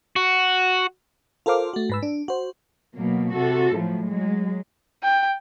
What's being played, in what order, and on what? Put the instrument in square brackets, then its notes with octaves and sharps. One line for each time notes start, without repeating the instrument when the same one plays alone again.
[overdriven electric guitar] F#4
[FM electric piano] F4 A4 A#4 C5 F5 D6
A3 F#4
G#2 B4 E6
D4
F#4 C5
[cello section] B2 F#3 A#3
C3 F#4 A4
A2 F3 F#3
F#3 G#3
[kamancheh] G5